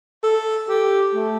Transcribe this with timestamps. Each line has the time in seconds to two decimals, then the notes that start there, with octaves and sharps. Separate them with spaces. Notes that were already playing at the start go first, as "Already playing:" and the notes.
0.23 A4
0.69 G4
1.15 A3